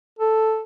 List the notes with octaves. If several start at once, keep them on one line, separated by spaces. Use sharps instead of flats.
A4